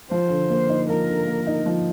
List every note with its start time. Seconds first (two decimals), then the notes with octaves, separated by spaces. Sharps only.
0.11 F3 C5
0.30 D3
0.50 A#3
0.69 D#4
0.89 F3 A#4
1.08 D3
1.27 A#3
1.47 D#4
1.66 F3